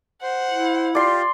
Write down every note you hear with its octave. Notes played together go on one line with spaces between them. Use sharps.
C5 F#5
E4
F4 G4 D5 C6